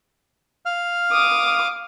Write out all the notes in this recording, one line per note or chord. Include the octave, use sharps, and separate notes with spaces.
F5 F6
D6 D#6